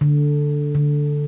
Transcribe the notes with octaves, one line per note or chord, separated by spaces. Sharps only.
D3
D3